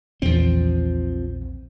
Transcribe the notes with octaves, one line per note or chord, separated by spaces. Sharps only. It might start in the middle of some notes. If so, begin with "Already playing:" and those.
A#1 E2 F3 C4